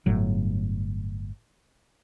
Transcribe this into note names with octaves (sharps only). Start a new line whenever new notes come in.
G1 A2 F#3